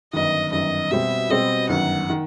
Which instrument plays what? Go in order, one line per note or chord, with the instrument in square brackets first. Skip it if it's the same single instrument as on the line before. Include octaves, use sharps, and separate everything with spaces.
[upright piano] G1 F#2 D#3 [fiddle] D#5
[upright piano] G1 F#2 D#3 [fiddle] D#5
[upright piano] B2 G3 C4 [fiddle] E5
[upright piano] B2 G3 C4 [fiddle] D#5
[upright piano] G1 F#2 D#3 [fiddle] F#5
[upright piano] D#3